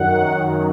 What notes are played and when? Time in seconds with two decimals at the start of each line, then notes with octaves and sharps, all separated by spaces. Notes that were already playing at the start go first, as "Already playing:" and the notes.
Already playing: F#2 D#3 F#3 F#5